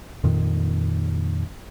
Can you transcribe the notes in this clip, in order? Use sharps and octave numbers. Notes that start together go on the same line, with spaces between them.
F2 A#2 D#3